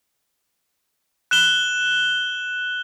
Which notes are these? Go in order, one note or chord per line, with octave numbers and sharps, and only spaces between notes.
F#6 E7 G7